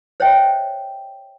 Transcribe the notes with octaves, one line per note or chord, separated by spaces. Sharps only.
C5 C#5 D#5 E5 G5